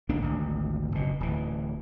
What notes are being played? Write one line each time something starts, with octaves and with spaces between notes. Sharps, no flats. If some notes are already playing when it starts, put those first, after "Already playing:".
C2 D3 A#3 D4
G#1 D2
F#1 B2
D1 E3